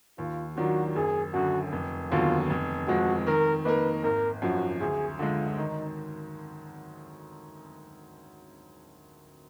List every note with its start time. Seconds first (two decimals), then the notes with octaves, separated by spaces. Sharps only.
0.18 D#2 F4
0.57 D#3 F#3 D4 F4 F#4
0.96 F#1 G#4
1.33 F#2 D3 F#4
1.72 F1
2.11 D#2 D3 F#3 B3 F4
2.50 F1
2.88 F2 F3 G#3 F#4
3.27 D#3 A#4
3.64 A#3 D#4 A#4 B4
4.03 G#1 A#4
4.42 F#2 F3 F#4
4.81 D2 G#4
5.19 D3 G#3 F4
5.57 D#3 D#4